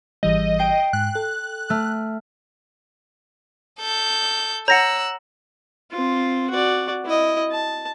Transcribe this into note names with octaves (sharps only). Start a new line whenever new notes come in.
G#1 E3 G3 D#5
G5 C7
G#2 F#6
A4
A3 F6
A4 G6
C#5 F#5 A#5 E6 F#6 A#6 C#7
C4 F4
F#4 D5
E4 D#5
A5